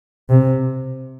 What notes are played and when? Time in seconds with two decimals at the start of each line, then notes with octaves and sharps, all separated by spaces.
0.30 C3